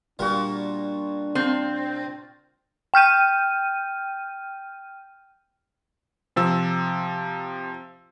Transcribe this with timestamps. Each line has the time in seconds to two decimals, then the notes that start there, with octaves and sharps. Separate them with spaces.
0.19 A#2 G3 D4 F4 F#4
1.35 C4 F4 A5
2.94 G5 F6 G6 D#7
6.36 C3 F3 E6